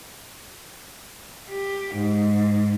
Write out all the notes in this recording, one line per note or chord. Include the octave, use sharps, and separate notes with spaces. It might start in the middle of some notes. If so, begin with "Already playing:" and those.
G4
G#2